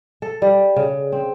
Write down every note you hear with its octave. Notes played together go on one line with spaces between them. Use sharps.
A4
G3
C#3
C4